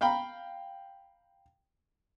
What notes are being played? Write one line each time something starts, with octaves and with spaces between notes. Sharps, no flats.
F5 G5 A#5 B5